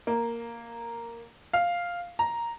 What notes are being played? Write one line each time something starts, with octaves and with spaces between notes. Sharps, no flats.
A#3
F5
A#5